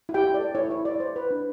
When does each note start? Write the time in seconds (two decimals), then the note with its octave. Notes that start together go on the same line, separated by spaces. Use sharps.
0.09 E4
0.14 G4 G5
0.24 E4
0.34 D5
0.40 A4
0.55 E4 C#5
0.70 E4
0.85 E4 D5
1.00 C5
1.16 B4
1.31 D4